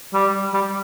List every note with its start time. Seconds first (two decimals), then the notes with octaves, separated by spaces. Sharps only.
0.13 G3
0.53 G3